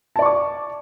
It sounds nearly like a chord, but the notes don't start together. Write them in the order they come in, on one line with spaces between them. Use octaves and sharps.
A5 D5 C#6 D6